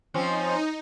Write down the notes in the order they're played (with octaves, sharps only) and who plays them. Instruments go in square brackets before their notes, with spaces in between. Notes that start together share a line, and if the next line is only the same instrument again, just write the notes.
[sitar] F3 C4 C#4 [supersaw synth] D#4